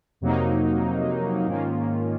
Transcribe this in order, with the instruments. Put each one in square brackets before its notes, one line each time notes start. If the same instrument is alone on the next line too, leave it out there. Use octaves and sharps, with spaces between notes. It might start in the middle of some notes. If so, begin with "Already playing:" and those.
[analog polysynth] F2 C3 F#3 A#3 D#4
G#2 D#3 A#3 C#4 F4